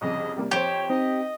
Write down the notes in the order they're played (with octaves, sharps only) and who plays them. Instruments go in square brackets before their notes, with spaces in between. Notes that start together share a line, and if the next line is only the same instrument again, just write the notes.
[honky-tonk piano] C2 F2 C#3 [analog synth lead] D#5
[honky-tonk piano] C3 G3 A#3
[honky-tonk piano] F2 C5 [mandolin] G4 [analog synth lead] C#5
[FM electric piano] C4 [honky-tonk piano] D#4 [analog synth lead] D#5